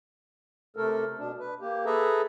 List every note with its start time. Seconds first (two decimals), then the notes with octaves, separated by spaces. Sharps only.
0.77 C3 A3 A4 A#4
1.19 B2 D4
1.40 B4
1.61 A#3 G4
1.86 G#4 A4 B4 E5 A#5